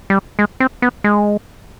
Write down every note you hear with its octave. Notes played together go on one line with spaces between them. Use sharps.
G3
G#3
C4
B3
G#3